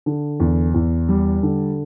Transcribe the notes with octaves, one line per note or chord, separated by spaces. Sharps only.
D3
E2
E2
G3
D3